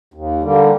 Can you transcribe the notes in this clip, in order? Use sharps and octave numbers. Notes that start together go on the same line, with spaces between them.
D#2
D3 G3 A#3